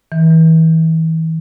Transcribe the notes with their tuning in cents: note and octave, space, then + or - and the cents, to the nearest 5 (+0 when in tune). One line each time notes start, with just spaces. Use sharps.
E3 -35